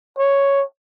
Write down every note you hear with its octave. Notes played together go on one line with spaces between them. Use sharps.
C#5